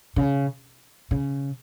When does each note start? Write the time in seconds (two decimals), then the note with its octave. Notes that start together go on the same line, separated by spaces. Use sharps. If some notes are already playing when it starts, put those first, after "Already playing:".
0.16 C#3
1.11 C#3